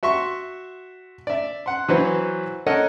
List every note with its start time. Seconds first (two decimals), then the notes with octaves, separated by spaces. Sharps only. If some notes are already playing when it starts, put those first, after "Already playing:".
0.03 F#4 E5 C6 C#6
1.27 D5 E5
1.66 F#5 C6
1.88 E3 F#3 F#4 B4 C5
2.66 A4 A#4 C#5 D#5 F#5